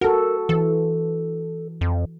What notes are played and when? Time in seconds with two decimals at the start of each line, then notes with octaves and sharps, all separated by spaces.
0.01 F#4 A4 A#4
0.49 E3 A4
1.81 F2